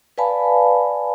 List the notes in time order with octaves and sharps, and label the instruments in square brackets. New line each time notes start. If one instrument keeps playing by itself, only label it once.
[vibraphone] B4 D5 F5 G#5 A5 B5